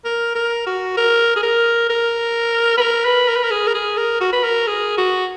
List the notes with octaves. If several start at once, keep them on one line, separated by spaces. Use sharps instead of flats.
A#4
A#4
F#4
A#4
G#4
A#4
A#4
B4
A#4
B4
A#4
B4
A#4
G#4
A#4
G#4
A#4
F#4
B4
A#4
G#4
F#4